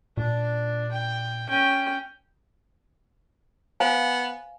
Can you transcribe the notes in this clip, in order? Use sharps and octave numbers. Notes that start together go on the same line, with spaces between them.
A#2 D4
G5
C#4 G5
B3 C5 F5 G#5